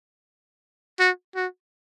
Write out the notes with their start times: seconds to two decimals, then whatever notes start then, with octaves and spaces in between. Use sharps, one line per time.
0.99 F#4
1.36 F#4